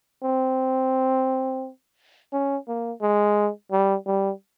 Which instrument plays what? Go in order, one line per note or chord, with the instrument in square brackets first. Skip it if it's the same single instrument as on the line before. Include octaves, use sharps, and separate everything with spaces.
[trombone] C4
C#4
A#3
G#3
G3
G3